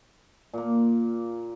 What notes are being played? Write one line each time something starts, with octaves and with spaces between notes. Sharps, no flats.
A#2 A#3